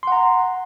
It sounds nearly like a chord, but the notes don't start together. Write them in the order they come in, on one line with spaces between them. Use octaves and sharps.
C6 F#5 A#5